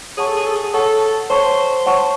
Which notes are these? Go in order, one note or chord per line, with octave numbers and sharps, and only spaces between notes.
G#4 C#5 F#5 A5 C#6
A4
G#4
A4
G#4
A4 C#5 F#5 A5 C#6
C5 C#5 F#5 A5 C#6
C#5 F#5 A5 C#6